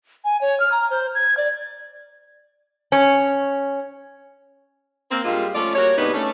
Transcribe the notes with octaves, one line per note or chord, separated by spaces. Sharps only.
G#5
C#5
F6
A#5
C5
G#6
D5
C#4
A#3 C4
G2 G3 G#3 A#3 F4
F3 A3 C#4 F4 D5
G3 A#3 F#4 C#5
G#2 C3 G3 B3 D4 D#4
A3 C#4 D4